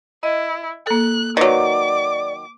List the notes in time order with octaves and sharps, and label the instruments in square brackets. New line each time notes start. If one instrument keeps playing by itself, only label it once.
[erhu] E4 [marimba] D#5
[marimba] A#3 A4 [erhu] F#6
[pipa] D#3 F#3 [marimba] B4 [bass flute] D5 [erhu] D6